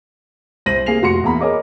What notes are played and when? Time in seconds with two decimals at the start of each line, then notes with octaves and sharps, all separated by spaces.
0.66 C2 C5 A#6 D#7 F#7
0.86 C3 A#3 G#4 C7 F7
1.02 F1 F#4 C6 C#7
1.24 E2 A#3 A#5 B5
1.41 G#4 A#4 C#5 D#5 D6